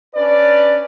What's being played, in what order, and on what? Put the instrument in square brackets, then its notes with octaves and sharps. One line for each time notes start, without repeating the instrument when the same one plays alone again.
[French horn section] C#4 D4 B4 D5